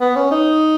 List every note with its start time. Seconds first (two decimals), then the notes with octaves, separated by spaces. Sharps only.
0.01 B3
0.16 C#4
0.32 D#4